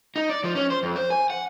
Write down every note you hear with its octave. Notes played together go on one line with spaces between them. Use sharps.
D#4
D5
F3
C#4
C5
F2
C5
G#5
F#5